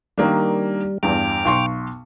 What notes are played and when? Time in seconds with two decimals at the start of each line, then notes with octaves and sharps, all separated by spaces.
0.18 D#3 G3 A#3 D4
1.03 E2 G2 G5 D6 F6
1.45 B1 C6 C#6